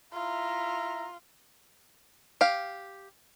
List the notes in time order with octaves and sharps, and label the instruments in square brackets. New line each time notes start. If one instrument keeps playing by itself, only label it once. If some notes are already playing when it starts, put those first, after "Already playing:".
[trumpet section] E4 E5 A#5 [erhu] F4
[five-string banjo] G4 F5